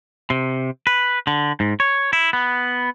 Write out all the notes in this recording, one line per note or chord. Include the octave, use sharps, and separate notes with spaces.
C3
B4
D3
G#2
C#5
E4
B3